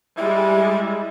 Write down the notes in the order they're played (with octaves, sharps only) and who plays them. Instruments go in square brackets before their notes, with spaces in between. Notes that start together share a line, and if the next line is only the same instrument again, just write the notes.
[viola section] G3 G#3 [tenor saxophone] E4